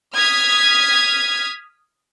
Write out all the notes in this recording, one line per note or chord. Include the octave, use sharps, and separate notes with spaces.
D#6 F6 G#6 B6